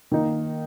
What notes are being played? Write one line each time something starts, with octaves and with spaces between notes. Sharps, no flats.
D#3 A#3 D#4